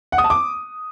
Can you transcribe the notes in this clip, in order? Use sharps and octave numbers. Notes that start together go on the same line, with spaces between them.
F#5
D#6
A5
D6